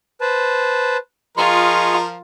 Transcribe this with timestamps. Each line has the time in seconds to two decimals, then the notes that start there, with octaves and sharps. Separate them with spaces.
0.21 B4 C5 A5
1.38 F3 F4 G#4 A#4 D#5 C6 C#6